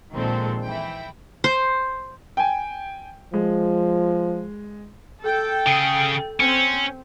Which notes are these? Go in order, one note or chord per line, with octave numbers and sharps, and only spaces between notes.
A#1 A#2 D#3 G#3 C4 A4
E3 E4 G5
C5
G5 G#5
F3 G#3
A4 G5
C#3 G#4
C4 C#4